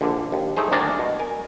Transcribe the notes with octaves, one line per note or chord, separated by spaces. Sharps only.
A#1 D3
D#2
A3 D#4 G#4 C5
D2 D#3 D4 D5 G#5 A#5
B2
A#4 G#5